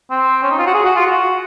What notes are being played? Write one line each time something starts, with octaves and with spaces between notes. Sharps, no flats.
C4
C#4
D#4
F4
F#4
G#4
F#4
F4
F#4